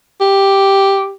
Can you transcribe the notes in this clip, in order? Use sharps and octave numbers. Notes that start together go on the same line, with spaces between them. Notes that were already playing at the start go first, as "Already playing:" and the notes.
G4